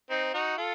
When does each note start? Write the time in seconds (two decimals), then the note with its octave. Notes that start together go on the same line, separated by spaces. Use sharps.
0.10 C4 D#4
0.34 D#4 F#4
0.57 F4 A4